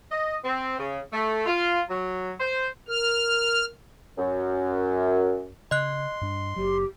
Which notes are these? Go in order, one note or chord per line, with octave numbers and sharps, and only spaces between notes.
D#5
C4
C#3
A3
F4
F#3
C5
A#4 F6
F#2
C#3 D#5 C6 F#6
G2 D4
F#1 F#3 G4